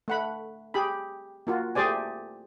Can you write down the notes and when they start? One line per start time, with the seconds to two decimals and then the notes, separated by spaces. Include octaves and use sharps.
0.08 A3 F#5 B5
0.74 G4 G#4 B5
1.47 A#3 F4 F#4
1.75 A3 G4 G#4 C5 D5 G#5